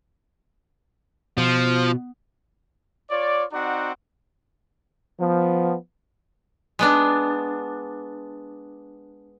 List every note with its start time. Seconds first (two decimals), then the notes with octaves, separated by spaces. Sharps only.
1.38 B2 F3
3.10 F4 C#5 D5
3.53 C4 D#4 F#4 D5 F#5
5.20 F3 B3
6.79 G#3 B3 D4